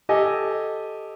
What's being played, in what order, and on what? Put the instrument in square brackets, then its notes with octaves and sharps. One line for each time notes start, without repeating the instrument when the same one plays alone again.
[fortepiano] G4 A4 D#5 G#5